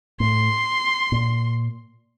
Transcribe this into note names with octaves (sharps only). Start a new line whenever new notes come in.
A2 C6
A#2